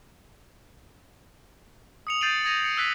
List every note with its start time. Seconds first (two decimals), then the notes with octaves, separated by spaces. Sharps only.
2.07 D#6 C#7 F7
2.21 G6 A6 C7 D7 D#7 F#7
2.45 D#6 G#6 A#6 D#7 F7 F#7
2.64 C#7
2.77 E6 F#6 B6 F#7